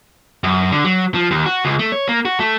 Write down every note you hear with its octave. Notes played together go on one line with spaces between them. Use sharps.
F#2
D3
F#3
F3
D#2
F#4
C#2
A3
C#5
A#3
F#4
A3